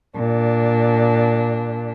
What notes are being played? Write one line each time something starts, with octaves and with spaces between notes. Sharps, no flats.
A#2 D4